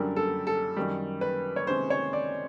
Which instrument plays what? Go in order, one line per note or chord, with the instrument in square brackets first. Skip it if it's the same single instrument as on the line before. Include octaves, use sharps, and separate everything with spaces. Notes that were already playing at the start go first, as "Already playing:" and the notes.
Already playing: [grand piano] F#2 D3 G3 [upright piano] A#4
[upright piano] A4
A4
[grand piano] F#2 D#3 G3
[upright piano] B4
C#5
[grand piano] C3 D#3 G#3 C#4 [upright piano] C5
[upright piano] C#5
D5